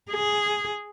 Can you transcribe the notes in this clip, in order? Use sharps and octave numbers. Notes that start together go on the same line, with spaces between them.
G#4